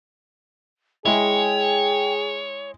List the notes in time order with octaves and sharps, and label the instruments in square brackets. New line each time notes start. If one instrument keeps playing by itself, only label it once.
[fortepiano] G#3 E4 [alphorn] G#4 [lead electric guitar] C#5 [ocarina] G5